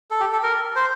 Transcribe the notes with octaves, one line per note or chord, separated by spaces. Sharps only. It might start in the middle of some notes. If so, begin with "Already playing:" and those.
A4
G4
A4
A#4
C5